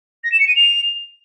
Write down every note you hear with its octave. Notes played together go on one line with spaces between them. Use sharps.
A#6
E7
C#7
D#7
F7